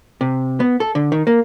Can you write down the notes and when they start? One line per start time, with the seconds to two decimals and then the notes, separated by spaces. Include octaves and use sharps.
0.21 C3
0.60 B3
0.80 A4
0.95 D3
1.12 D#3
1.27 A#3